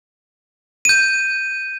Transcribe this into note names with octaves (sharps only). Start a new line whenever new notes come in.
G6 D#7